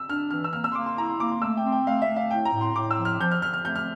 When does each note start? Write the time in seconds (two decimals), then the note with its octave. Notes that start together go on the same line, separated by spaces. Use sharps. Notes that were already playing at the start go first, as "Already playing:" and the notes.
Already playing: E6
0.09 D4 F6
0.31 E3 F6
0.44 E6
0.53 A#3 F6
0.64 E6
0.72 C6
0.75 A#3 D6
0.86 C6
0.98 E4 A#5
1.08 C6
1.20 A#3 D6
1.32 C6
1.42 A3 E6
1.57 G5
1.65 C4
1.72 G5
1.86 A3 F5
2.02 E5
2.08 A3
2.16 F5
2.31 A2 G5
2.45 A#5
2.53 A2
2.61 C6
2.75 A2 D6
2.91 E6
2.98 F3
3.05 F6
3.20 F3 G6
3.31 F6
3.42 F3 F6
3.54 F6
3.65 A3 G6
3.76 F6